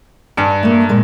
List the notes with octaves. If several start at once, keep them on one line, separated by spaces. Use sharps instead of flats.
G2 G#5
A3 A#3
A#2 G#3